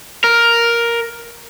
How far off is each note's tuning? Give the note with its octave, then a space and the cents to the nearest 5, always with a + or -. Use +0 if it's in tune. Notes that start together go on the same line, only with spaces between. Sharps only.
A#4 +5